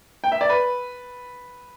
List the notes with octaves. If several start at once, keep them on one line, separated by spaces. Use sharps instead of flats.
G5
E5
D5
B4